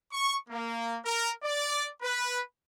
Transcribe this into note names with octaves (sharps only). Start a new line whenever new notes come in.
C#6
A#3
A#4
D5
B4